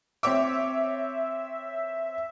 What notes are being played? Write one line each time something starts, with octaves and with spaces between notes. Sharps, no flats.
C4 C#5 E5 D6